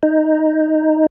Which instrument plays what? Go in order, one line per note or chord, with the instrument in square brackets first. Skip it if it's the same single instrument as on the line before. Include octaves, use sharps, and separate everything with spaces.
[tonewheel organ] D#4